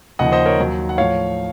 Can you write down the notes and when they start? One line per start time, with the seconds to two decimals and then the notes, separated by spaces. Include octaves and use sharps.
0.19 D#2 C#3 F3 D#5 F#5
0.32 C5 D#5
0.46 A#4 C#5
0.59 D#2 D#3 F#3
0.89 F#5
0.98 A2 F3 C#5 F5